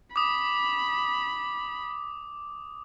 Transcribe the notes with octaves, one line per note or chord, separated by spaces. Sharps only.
B5 D6 D#6